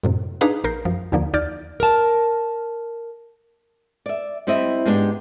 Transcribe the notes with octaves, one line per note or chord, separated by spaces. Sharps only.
F#2 A2 C3
D4 D#4 G#4 B4 F5 A#5
A#1 A#4 G6 C7
F#2 F3
D#2 D3 F3 A#3
D#2 D5 F6 G6 A6
A#4 A5
D5 E5
G3 C4 E4 D#5 E5
G#2 B3 D4 F4 G4